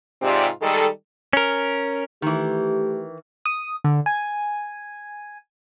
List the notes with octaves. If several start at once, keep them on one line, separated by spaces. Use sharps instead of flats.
G#2 C3 C4 F4 G4 D5
D#3 G3 G#3 A4
C#4 A#4
D#3 E3 A3 G4
D#6
D3
G#5